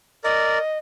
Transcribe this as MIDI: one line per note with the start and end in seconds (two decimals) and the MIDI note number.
0.24 0.58 70
0.24 0.58 74
0.24 0.78 75